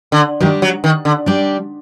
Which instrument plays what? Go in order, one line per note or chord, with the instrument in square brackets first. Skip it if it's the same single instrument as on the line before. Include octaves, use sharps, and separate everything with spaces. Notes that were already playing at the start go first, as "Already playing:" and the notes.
[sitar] D3
[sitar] D#3 [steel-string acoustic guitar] G3 D4 G4 D5
[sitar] F#3
D#3
D3
[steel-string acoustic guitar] G3 D4 G4 D5